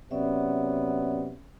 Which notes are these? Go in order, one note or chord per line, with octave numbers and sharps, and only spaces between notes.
C3 F#3 B3 C#4 D5 E5